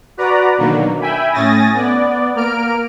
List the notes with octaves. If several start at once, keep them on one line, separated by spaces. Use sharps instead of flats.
F#4 B4 D5 A#5
B2 D3 D#3 F#3 A#3
E5 G5 G#5 B5
A2 C#4 G#5 D#6 A6 A#6
B3 D5
A#3 A#4 F6 D7